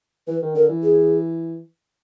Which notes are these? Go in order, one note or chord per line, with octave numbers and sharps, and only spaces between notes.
E3 B4
D#3
D3 A#4
E3
G#4